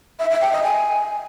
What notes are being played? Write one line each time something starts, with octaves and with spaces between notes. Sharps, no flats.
E5
E5
G5
D#5
G#5